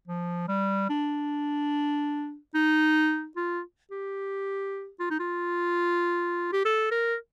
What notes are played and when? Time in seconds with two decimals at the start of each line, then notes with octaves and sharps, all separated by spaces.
0.07 F3
0.48 G3
0.89 D4
2.55 D#4
3.36 F4
3.91 G4
5.00 F4
5.10 D#4
5.19 F4
6.53 G4
6.65 A4
6.91 A#4